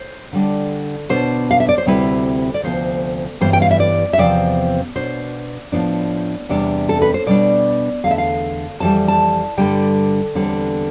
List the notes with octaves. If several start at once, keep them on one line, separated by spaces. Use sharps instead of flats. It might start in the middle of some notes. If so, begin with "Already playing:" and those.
Already playing: C5
D3 G3 D4
B2 B3 D4 C5
F5
E5
D5
C5
D2 C3 G3 C4 E4 B4
D5
D2 C3 F3 B3 C5
G2 E3 G3 B3 E4 C5
G5
F5
E5
D5
E5
E2 C3 F3 C4 D5
B2 B3 D4 C5
A2 F3 B3 D4
E2 C3 G3 D4
A4
B4
C5
B2 G3 D4 D5
E2 D3 A3 F5
E5
F5
F2 E3 G3 A5
A5
G2 D3 G3 G5
E2 D3 G3 C4